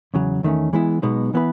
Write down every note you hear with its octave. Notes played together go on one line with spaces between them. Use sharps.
E2 C#3 F#3
E2 D#3 A3 C#4
E3 G#3 B3 E4
B1 B2 G#3 B3 D#4
E3 B3 E4 B4